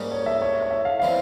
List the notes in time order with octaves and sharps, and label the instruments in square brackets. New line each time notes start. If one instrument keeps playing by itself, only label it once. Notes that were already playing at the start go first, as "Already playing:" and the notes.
Already playing: [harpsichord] G#2 G3 A#3 C#4 G4
[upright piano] C#5
E5
C#5
C#5
E5
F5
[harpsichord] E3 G3 C4 [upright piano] F5